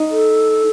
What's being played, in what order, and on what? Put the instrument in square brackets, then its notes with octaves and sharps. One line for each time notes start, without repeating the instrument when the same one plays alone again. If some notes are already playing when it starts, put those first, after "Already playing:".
Already playing: [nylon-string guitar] D#4
[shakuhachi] A4